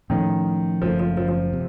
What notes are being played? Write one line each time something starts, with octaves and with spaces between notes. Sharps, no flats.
A2 D#3 F3 A3 C#4
F#1 F#2 C#3 F3 A3
F3
F3
F3
C3